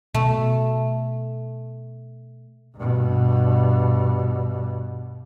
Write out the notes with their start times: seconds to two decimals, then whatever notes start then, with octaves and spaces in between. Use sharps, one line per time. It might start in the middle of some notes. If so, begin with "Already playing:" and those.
0.14 B2 A3
2.76 G2 B2